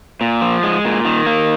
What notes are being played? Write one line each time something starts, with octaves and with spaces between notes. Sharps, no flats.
A#2
F3
G#3
A#2
D#3
A#3